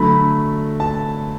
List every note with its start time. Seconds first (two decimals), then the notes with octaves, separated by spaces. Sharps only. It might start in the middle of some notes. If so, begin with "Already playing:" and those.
Already playing: D3 F#3 A3 B5
0.80 A5